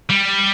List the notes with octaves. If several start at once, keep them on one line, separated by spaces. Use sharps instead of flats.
G3